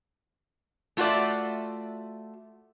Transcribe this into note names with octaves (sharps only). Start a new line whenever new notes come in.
A3 F4 F#4 A4 D5 E5